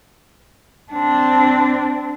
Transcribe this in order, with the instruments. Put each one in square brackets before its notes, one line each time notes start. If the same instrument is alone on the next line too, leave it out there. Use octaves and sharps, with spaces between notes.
[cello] C4 D4